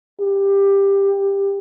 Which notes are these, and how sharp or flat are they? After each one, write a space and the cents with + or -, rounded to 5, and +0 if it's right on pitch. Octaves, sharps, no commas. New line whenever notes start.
G4 +15